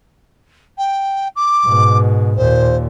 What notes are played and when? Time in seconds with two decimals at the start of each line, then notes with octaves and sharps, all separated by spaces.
0.78 G5
1.36 D6
1.66 G#2 B2
2.37 D#2 A#2 C5